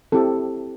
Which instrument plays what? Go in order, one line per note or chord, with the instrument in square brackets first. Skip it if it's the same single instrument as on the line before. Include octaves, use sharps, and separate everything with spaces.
[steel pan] C4 E4 G4 A4